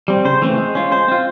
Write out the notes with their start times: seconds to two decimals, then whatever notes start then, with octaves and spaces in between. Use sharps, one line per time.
0.08 G3 C4
0.25 C#3 C5
0.42 E3 A3 C4
0.58 G#3
0.75 C#4 F4
0.92 G#3 C5
1.08 C4 F4